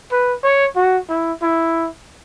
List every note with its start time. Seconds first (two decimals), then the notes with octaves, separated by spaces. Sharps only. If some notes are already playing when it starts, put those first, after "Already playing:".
0.12 B4
0.43 C#5
0.76 F#4
1.10 E4
1.42 E4